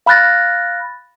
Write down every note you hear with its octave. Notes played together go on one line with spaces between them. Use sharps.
F5 B5 F6 F#6 A6 A#6